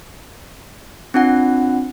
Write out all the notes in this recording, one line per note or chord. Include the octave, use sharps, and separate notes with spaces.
C4 D4 F4 F#5